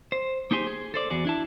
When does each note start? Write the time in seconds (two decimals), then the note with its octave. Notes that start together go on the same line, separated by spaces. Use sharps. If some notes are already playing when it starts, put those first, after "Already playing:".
0.12 C5
0.51 A#3 D#4 G4 G#4 C5
0.67 G#4
0.94 A4 C5 D5
1.10 E2 F#4 G#4 D5
1.25 D4 E4 A5